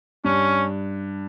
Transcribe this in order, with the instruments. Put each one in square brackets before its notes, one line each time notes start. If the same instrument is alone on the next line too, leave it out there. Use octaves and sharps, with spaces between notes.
[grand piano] G2 [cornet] C#4